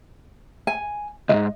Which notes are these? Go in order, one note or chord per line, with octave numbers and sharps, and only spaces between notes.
G#5
C#2 G#2 D#5